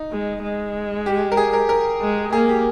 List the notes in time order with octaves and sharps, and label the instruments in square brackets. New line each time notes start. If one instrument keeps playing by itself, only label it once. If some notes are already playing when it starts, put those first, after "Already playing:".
Already playing: [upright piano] D#4
[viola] G#3
G#3
[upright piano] G4
A#4
G#4
A#4
A#4
[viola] G#3
[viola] A#3 [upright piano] G#4
[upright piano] G4